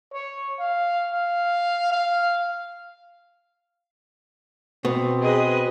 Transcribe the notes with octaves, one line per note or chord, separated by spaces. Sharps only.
C#5
F5
F5
F5
B2 C4
G#4 B4 D#5